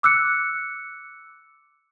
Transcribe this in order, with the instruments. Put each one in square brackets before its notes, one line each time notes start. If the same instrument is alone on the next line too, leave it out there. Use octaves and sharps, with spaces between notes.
[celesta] D6 E6 F#6 C#7